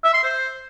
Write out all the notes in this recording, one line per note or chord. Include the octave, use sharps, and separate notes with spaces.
E5
C6
C5